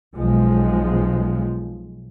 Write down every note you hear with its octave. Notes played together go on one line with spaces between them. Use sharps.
B1 F3 G#3